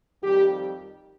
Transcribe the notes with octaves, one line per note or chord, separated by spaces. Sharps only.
F2 D#3 G3 G4